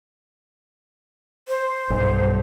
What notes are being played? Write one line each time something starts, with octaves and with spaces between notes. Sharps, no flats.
C5
B1 G2